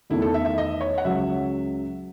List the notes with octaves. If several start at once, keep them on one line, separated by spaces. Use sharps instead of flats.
E2 D#3 A3 E4
A4
E5
E5
D#5
C#5
F#5
C#2 C#3 F#3 E5